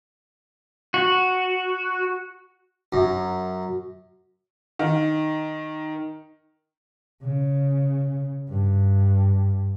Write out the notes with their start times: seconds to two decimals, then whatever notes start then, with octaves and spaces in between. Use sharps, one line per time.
0.94 F#4
2.93 F#2
4.79 D#3
7.23 C#3
8.49 G2